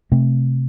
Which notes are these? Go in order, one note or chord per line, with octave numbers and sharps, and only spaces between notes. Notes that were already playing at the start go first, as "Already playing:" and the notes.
C3 A3 C4